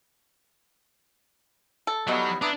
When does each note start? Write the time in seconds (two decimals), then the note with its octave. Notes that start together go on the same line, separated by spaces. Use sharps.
1.87 A4
2.07 F#3 G3 B3 D#4 E4 F#4 C#5
2.42 B3 D4 E4 A#5 D6 D#6